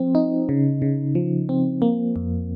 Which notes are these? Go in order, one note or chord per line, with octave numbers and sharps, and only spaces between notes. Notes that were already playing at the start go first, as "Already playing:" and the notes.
Already playing: F3 C4
D#4
C#3
C#3
F3
C4
A#3
F2